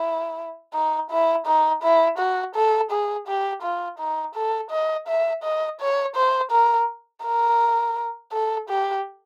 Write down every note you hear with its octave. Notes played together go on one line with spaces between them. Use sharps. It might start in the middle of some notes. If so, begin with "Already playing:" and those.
Already playing: E4
D#4
E4
D#4
E4
F#4
A4
G#4
G4
F4
D#4
A4
D#5
E5
D#5
C#5
C5
A#4
A#4
A4
G4